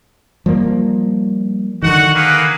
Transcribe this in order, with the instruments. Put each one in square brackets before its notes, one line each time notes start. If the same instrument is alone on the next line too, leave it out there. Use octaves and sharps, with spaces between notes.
[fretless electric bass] F3 G3 A#3
[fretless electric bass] D3 D#3 [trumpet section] F#4 F#5
[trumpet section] A#3 G#4 B4